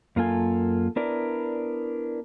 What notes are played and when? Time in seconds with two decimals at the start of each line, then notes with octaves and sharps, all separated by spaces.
0.16 F#2 A#3 F4 A4 G#5
0.96 B3 D4 E4 A#4 B4 D5